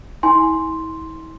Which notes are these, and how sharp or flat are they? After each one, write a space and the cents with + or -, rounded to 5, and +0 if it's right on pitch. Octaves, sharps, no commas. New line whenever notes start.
E4 -40 G#5 +0 C6 +0